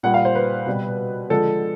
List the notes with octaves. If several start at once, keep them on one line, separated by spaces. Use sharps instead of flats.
A#2 G3 F#5
F5
C5
B4
B2 G3
D3 F3 G#3 A4